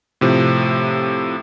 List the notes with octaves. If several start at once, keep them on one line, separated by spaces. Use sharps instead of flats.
A2 C3 F3